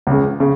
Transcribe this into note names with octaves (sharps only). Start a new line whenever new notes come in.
C#2
C#3
C#3